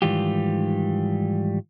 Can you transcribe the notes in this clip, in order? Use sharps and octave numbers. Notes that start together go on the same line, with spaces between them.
G#2 D#3 E3 G3 F4 G4